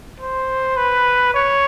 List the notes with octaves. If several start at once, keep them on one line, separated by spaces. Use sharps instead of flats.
C5
B4
C#5